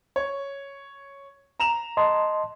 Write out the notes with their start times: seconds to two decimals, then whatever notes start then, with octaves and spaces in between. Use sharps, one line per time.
0.16 C#5
1.60 A#5 E7 F7
1.97 D#5 A5 C6